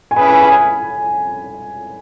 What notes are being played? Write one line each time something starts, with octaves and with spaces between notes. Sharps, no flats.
G#5
C#4 E4 G#4 B4 B5
G#5
G#5
G#5